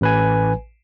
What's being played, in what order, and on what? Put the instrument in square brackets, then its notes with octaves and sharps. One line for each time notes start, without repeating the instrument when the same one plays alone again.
[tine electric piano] A1 B4 G#5